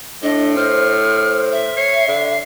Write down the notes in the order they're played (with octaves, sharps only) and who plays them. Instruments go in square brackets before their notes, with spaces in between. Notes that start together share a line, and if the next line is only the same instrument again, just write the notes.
[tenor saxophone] A2 [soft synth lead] D4 [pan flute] D#5
[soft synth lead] C5 [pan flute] F6
[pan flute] E5
[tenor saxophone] C#5 [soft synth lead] C7
[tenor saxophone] D3